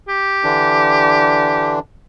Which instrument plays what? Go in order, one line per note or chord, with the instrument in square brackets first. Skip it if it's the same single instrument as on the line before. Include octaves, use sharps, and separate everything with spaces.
[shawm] G4
[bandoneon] D3 E3 D4